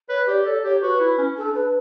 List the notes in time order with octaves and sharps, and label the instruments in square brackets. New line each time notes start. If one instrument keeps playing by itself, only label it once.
[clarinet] B4 [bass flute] C#5
[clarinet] G4 [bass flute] D5
[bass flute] D5
[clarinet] A4 [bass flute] C#5
[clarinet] G4 [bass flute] C#5
[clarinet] F#4 [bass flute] B4
[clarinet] E4
C#4
[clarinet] D4 [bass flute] A4
[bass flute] B4